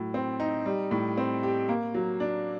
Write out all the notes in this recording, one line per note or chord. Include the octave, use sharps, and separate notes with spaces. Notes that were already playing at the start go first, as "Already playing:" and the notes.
Already playing: A2 F#3
C4
D#4
G3
A2
C4
G4
A#3
F#3
D4